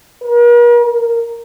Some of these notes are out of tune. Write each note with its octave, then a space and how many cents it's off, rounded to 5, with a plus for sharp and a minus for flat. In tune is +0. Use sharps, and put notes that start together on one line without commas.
A#4 +45
A#4 -5